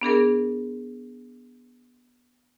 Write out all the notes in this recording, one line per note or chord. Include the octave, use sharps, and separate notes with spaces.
B3 D4 G#4 A#4